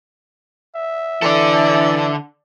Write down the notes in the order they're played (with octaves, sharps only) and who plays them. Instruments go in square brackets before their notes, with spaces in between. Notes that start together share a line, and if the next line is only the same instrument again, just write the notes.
[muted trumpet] E5
[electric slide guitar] D3 A4 [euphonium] E3 [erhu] D5